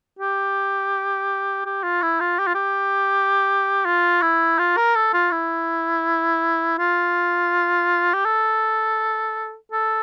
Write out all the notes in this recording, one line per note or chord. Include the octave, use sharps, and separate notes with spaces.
G4
G4
F4
E4
F4
G4
F4
G4
F4
E4
F4
A#4
A4
F4
E4
F4
G4
A4
A4